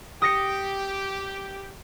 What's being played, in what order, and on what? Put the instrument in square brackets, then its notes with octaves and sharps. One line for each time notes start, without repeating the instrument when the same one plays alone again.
[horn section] G4 [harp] D#6 A#6 C#7